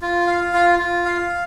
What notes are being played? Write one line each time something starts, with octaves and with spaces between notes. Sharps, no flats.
F4
F5
F4
F4
F5